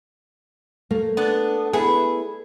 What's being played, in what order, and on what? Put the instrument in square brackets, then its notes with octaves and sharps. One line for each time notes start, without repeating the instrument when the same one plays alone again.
[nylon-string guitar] A3 [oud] A#3
[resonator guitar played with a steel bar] B3 D4
[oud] B3 E4 [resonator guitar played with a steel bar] G#4